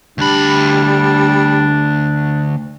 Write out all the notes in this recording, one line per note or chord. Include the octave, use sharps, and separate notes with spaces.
D2 G3 D4 B5